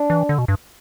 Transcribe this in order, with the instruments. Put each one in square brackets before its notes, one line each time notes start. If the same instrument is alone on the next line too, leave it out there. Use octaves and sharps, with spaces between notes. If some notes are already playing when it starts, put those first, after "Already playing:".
Already playing: [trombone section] D4
[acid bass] E3
D3
B2
G2